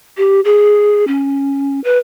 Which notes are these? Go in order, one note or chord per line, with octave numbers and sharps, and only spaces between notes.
G4
G#4
C#4
B4